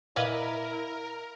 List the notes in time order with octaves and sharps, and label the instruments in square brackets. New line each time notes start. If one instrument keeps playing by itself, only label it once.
[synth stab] A#2 B4 D#5 [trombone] E4 [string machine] A#4 [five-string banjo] D5 F5 G#5